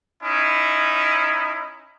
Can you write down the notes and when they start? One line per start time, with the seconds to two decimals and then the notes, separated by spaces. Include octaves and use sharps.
0.22 C#4 D#4 E4